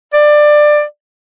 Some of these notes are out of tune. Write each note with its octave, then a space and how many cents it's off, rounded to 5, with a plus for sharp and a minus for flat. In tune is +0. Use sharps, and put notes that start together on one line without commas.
D5 +20